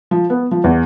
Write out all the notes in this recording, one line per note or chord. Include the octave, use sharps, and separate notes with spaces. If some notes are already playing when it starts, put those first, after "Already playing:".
F3
B3
F3
E2